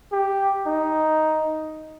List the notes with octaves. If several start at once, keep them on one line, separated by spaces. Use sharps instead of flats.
G4
D#4